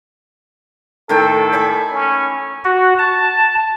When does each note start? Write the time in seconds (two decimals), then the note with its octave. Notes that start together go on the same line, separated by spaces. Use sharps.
1.09 A2 D#3 A4 G5
1.53 G#5 B5 D6
1.92 C#4
2.64 F#4
2.99 A5